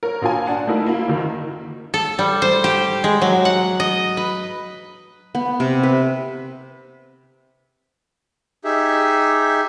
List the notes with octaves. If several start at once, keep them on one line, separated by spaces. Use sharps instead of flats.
A#4 C#5
A#1 F4 G#5
D4 F#5 A5
A3 A#3 D#4 E4 A#4
A#3 E4 F4
F#1 D#3
A4
G3
C5
G4
G#3
F#3
F#5
D#5
B4
B3
C3
B4
D#4 G4 G#4 E5